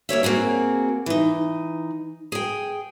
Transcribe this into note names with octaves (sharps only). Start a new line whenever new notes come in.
G3 A#3 C#5 E5
A#3 C4 F#4 G#4
E3 D#4
G#4 G5